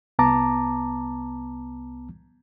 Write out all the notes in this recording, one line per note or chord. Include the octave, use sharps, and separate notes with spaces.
C2 B3 A5 A#5 D6